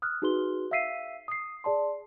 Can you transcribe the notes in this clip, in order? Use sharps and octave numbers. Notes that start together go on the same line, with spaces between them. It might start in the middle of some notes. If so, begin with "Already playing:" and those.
D#6 F6 F#6
D#4 F#4 G#4 B4 C6 G7
E5 F5 E6 B6 C7 D#7
D#6 C7
G#4 D5 A5 C6